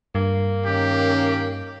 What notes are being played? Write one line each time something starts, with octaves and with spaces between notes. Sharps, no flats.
G2 A#3
D#3 C#4 G4